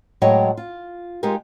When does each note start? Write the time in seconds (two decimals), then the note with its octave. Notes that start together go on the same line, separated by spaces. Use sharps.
0.22 A2 F#3 G#3 C#5 D#5 G5
0.57 F4
1.23 G#3 D#4 F4 G4 A#4